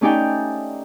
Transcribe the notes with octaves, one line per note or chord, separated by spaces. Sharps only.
A3 C#4 D#4 G4 D5 G5